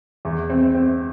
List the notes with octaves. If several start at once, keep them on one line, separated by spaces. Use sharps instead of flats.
E2
C4
C4